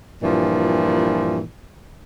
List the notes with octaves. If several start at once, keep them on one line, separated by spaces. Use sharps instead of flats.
G2 A#2 E3 F3